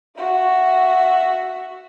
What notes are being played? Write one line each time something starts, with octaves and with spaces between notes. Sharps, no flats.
F#4 E5